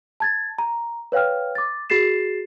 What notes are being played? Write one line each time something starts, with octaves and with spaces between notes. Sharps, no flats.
A5 G#6 A6
A#5
B4 C#5 F5 G5 F6
D6 A6
F#4 G#4 A6 C7 E7